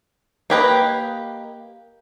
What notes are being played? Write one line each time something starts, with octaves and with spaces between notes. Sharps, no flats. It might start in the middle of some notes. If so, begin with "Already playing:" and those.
A#3 G4 B4 D#5